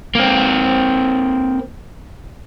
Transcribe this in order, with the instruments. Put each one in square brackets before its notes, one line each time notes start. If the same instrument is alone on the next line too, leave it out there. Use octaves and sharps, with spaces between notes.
[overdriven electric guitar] A#3 C4